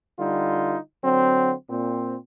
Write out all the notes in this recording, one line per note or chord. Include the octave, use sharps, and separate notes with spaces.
D3 G3 D#4 F4
D3 F#3 C4
A#2 C4